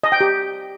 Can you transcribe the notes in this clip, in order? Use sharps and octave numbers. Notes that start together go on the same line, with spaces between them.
D#5
G5
G4